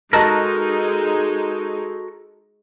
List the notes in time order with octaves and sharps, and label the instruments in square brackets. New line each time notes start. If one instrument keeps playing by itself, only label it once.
[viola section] G#3 D#4 [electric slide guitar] F#4 A4 A#4 [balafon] D#5 A5 A#5